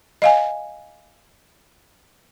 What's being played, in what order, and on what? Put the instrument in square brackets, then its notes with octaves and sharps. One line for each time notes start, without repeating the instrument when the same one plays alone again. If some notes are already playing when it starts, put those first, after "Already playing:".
[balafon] D#5 F5 G#5